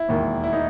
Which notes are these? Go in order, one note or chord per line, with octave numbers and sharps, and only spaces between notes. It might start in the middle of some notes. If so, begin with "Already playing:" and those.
Already playing: E4
E1 D#2 D#3
E4
D#4